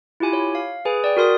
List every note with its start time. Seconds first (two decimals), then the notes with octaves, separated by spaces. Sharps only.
0.20 E4 F4 G4 G#5 B5
0.33 C#5
0.55 F5
0.85 G#4 B4 G#5
1.04 D5 G5
1.17 F#4 A#4 C6 D#6